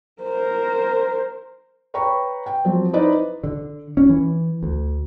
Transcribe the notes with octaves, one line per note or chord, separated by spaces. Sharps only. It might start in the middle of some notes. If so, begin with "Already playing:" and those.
A#4 C5
B4 C#5 G5 A#5 B5 C#6
G5
F3 F#3 C4
D#4 E4 B4 C5 D5 D#5
D3
C#4
E3
D2